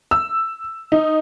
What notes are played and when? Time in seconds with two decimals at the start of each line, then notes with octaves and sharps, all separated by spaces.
0.11 E6
0.92 D#4